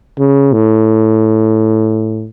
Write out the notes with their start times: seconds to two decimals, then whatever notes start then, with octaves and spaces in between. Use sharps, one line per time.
0.19 C#3
0.53 A2